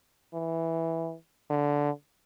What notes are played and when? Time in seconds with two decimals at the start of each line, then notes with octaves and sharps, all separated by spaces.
0.33 E3
1.50 D3